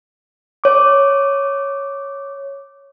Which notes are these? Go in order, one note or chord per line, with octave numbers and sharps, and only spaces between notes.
C#5 D6